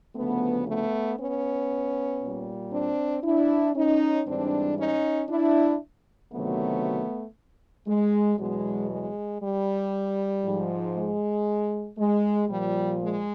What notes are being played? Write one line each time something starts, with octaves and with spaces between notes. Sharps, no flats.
D2 C#3 F3 A3 B3
A3 B3
B3 C#4
A#2 G3
C4 D4
D4 E4
C#4 D#4
G#2 E3 G3 C4 D4
C#4 D#4
D4 E4
D2 C3 D#3 F#3 A3 B3
G#3
E2 B2 F#3 G#3
G#3
G3
G#2 F3
G#3
G#3
A#2 F3 G3
G#3